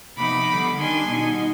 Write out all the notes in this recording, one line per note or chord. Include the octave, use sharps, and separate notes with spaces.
C3 F3 B3 D#4 B5 D6
D3 G3 B3
D#3 G3 D4 G#5 C6
B2 G3 B3 D#4